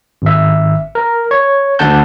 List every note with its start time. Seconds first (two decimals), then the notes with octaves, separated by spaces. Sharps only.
0.22 G#1 E5
0.95 A#4
1.31 C#5
1.79 D2 D3 F#5 A5 G6